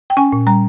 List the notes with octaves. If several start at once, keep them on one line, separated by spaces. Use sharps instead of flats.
G5
C#4 G#5
A#2
G3 A#5